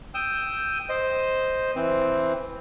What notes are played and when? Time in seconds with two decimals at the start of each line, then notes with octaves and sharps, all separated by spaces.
0.14 G5 D#6 E6 G6
0.89 C5 D#5
1.76 E3 C4